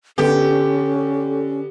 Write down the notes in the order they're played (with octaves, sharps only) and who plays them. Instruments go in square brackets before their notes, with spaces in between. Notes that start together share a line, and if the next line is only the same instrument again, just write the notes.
[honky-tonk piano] D3 B3 [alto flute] C#4 [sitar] G4 [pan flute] A4